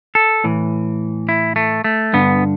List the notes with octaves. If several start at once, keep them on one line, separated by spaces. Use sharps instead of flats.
A4
A2 E3
E4
A3
A3
G2 D3 B3